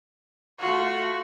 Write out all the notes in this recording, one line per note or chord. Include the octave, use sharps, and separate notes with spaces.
A3 F4 F#4